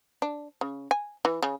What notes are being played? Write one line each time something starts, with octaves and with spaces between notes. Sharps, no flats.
D4
C#3
G#5
E3
C#3